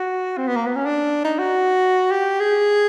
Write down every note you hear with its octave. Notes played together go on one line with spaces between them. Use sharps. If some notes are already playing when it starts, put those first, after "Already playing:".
Already playing: F#4
C4
B3
A#3
B3
C#4
D4
D#4
F#4
G4
G#4